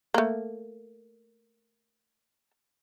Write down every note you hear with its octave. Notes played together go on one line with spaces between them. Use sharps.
A3 A#3